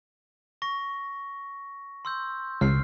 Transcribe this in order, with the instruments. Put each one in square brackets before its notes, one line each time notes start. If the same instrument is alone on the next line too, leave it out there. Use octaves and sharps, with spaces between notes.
[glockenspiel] C#6 A#6
C6 E6 G6
[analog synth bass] C#2 [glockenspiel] F6 C7